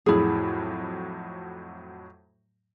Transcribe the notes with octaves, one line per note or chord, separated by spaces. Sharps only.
F2 A2 F#3 E4 G#4